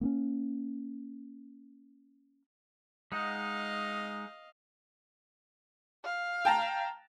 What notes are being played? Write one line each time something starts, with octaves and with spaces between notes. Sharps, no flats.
A#3 B3 C#4
G#3 D#4 D#5 F5 F#5
F5
G5 A5 A#5